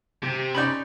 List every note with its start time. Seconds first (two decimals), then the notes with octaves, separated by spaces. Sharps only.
0.23 C3 G4
0.55 C#4 D#4 D5 B5 G6